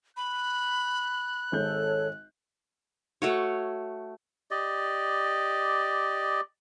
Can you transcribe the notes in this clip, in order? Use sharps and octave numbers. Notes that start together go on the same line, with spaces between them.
B5 F#6
G#1 G#3 A4 C#5 G6
A3 F#4 C#5
G4 D5 D#5